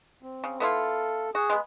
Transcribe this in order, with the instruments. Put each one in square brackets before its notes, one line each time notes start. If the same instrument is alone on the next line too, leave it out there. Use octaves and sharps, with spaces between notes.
[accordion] C4
[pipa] C#3
[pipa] B3 E4 F4 [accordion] A4
[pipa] F#4 [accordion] G#4
[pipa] G#3 B3